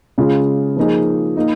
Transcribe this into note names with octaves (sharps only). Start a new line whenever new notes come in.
C#3 G#3 F4 G#4
F3 A#3 D#4 G#4
A#3 D#4